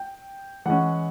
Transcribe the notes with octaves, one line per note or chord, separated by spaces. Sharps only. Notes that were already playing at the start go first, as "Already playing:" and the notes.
Already playing: G5
E3 G#3 C#4 F#5